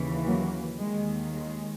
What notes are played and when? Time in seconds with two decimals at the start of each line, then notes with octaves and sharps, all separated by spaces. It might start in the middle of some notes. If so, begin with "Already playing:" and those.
Already playing: D#2 C#3 E3
0.25 F#3 A#3
0.80 D#2 D#3 G#3
1.35 G#3